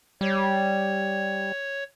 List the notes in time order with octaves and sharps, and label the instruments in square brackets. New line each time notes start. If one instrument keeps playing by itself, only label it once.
[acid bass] G3 [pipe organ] C#5